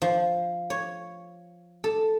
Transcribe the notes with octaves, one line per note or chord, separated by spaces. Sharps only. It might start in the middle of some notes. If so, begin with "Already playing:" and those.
F3
C#5
A4